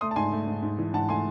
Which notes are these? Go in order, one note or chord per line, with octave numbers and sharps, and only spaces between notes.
A3 C6 D#6
A5
G#2 G#5 C6
A3
G#2
G#2
E3
G#2 F#5 A5
A3 G#5 C6